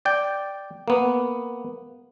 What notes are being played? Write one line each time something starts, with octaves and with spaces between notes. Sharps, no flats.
D5 G5
A#3 B3